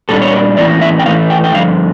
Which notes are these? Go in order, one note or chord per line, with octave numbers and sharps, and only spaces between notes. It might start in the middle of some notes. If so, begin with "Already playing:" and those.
A#2 G3 D4 A4
C#5
A#4
A2 E3 A#3 C#4 D5
E5
G5
A2 E3 A3 C#4 F5
G5
G5
G2 D3 F3 F5